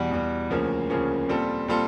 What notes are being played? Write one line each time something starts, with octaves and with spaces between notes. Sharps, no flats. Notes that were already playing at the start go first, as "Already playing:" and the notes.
Already playing: E2 B2 G3
E2 B2 G3
D2 C#3 F3 A#3 C#4
D2 C#3 F3 A#3 C#4
A#2 G3 C4 F4 A4
A#2 G3 C4 F4 A4